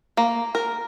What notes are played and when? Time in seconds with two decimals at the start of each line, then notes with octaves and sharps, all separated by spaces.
0.17 A#3
0.55 A#4